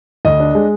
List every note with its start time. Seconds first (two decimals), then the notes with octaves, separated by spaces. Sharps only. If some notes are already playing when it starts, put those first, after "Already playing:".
0.25 D2 D#5
0.40 D4
0.55 G#3